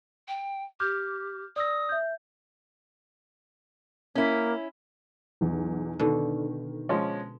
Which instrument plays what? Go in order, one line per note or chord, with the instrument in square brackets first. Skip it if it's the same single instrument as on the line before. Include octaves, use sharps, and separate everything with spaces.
[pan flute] G5
[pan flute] G4 [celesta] D6 F6 G6
[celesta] D5 E6 A#6 [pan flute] D#6
[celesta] E5 G6
[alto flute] A#3 [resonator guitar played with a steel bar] C#4 E4
[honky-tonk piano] B1 E2
[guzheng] B2 D3 [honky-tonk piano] D#3
[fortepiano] F3 G#3 C#4